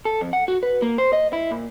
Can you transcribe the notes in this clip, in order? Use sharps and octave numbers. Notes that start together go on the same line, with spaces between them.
A4
F2
F#5
F#4
B4
A#3
C5
D#5
E4
A#2